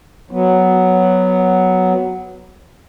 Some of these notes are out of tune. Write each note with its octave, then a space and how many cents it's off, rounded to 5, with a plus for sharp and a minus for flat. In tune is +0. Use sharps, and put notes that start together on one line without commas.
F#3 +0 B3 +0